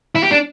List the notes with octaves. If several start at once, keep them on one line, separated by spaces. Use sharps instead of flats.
E4
G4
D4